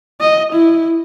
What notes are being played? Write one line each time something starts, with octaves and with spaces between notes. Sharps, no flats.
D#5
E4